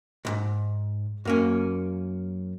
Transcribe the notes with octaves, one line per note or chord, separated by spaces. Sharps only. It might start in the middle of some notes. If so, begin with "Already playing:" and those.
B1 G#2
F#2 A#3 C#4